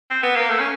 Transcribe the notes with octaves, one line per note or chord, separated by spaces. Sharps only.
C4
B3
A#3
A3
C#4